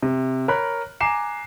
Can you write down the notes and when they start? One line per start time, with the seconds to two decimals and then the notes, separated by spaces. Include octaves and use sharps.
0.03 C3
0.48 A#4 C#5 B5 F#6
1.01 G#5 A#5 D6 C7 E7